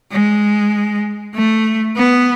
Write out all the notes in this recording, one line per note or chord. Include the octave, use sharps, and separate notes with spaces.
G#3
A3
B3